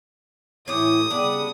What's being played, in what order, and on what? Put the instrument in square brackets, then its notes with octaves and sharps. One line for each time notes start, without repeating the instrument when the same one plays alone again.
[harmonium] A2 E3 [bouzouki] C#4 G4 [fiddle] D#6
[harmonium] C#3 G3 [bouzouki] B3 D4